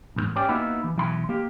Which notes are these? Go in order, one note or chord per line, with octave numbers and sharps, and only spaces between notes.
B1 E2 G#2
C#4 G4 D5
A#3 B3 D#4 E4 F#4
E3
B1 E3 B5 C6
A#3 G4